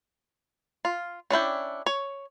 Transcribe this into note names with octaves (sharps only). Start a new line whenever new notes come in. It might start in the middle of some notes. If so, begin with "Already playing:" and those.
F4
C#4 D4 E4 G5
C#5